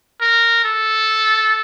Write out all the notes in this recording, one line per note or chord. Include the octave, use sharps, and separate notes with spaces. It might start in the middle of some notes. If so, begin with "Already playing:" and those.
A#4
A4